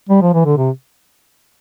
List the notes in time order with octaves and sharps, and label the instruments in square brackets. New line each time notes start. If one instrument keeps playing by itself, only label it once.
[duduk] G3
F3
E3
D3
C3